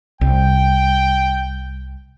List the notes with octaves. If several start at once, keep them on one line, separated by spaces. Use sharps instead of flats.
C2 G5